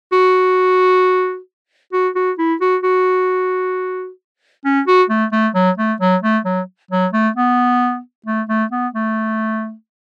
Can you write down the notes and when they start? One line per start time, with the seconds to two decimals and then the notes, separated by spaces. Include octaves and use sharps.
0.12 F#4
1.93 F#4
2.15 F#4
2.38 E4
2.61 F#4
2.83 F#4
4.65 C#4
4.87 F#4
5.10 A3
5.32 A3
5.55 F#3
5.78 A3
6.01 F#3
6.23 A3
6.45 F#3
6.91 F#3
7.13 A3
7.36 B3
8.26 A3
8.49 A3
8.72 B3
8.94 A3